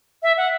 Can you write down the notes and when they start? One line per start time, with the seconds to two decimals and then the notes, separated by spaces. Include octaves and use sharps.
0.23 E5
0.37 F#5